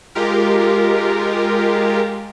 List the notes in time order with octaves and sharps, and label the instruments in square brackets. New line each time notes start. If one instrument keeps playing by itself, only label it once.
[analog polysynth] G#3 F4 G4 A#4